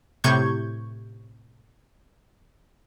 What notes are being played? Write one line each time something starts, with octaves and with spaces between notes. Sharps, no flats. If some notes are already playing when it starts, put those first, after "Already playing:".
A2 C3 C#6 G6 G#6